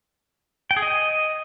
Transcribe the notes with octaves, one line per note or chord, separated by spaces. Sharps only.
G5
G#4
D#5